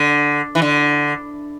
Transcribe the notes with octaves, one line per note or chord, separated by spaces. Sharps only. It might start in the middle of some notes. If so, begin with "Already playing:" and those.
Already playing: D3
E3
D3